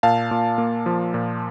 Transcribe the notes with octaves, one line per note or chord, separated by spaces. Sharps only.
A#2 F5 A5
A#2
A#3
F3
A#2